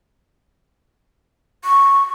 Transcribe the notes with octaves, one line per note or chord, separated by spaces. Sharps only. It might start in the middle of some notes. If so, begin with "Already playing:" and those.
C#6